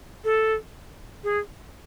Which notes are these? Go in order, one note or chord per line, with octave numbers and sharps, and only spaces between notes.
A4
G#4